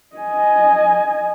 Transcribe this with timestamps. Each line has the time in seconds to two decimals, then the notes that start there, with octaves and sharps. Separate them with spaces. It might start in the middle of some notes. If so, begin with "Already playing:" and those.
0.16 D#5 G#5